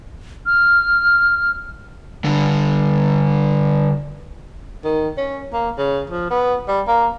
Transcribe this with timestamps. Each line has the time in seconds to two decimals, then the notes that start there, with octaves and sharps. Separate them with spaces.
0.46 F6
2.25 D3 G3
4.84 D#3
5.17 C#4
5.53 A#3
5.78 C#3
6.10 F3
6.30 B3
6.68 G3
6.87 A#3